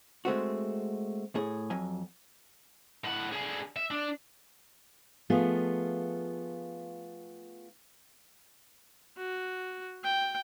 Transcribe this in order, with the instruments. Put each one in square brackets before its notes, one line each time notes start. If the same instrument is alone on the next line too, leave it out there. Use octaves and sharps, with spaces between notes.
[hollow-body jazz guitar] G#3 A3 C4 F#4
A2 G#4
F2 F#3 G#5
[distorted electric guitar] A2 F#5
D3 G#4
E5
D4
[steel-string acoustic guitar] F3 A3 B3 F4 G#4
[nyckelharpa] F#4
G5